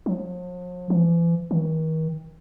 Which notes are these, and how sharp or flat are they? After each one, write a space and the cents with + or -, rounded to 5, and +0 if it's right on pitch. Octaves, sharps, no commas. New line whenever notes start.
F3 +45
E3 +40
D#3 +40